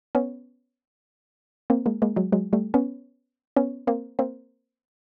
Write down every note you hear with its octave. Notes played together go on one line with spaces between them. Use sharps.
B3 C#4
A#3 C4
G#3 A#3
G#3 A#3
F#3 G#3
F#3 G#3
G3 A3
B3 C#4
B3 C#4
A#3 C4
A#3 C4